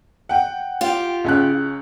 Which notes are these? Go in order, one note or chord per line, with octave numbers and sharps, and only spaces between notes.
F#5 G5
F4 G4
C#2 C#4 F#6